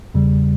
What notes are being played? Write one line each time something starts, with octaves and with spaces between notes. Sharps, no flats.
E2 C#3 G3